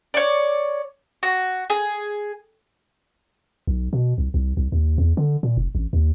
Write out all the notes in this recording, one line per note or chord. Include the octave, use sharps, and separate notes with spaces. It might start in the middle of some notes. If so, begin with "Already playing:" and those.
C#5 D5
F#4
G#4
B1
B2
C2
C2
C2
D#2
E2
D3
A#2
F1
A1
D#2